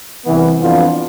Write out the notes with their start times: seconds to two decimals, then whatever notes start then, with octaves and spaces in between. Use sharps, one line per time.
0.25 C2 C3 E3 B3
0.59 F2 E3 B3 D4 F4